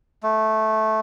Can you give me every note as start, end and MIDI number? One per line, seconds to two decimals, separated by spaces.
0.23 1.00 57